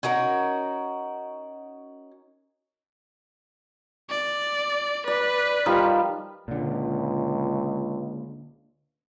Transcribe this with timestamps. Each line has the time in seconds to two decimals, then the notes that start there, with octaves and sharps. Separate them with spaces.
0.03 C#4 D#4 F#4 A#4
4.10 D5
5.08 B4 D5
5.66 D#3 F3 G3
6.48 C#2 A#2 D3